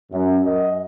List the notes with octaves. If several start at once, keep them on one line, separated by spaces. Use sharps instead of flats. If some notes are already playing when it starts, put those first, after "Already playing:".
F#2
D#5